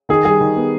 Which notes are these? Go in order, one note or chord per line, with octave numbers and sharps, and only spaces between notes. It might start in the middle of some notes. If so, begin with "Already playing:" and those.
D#3 G#4
G3 G#4
D#3
B3